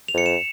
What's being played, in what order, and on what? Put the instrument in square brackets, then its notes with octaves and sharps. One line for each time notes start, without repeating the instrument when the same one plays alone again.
[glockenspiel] F7
[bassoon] F2 [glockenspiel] C#7
[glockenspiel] E7